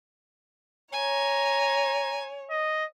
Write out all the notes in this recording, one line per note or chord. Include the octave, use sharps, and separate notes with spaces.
C#5 G#5 A#5
D#5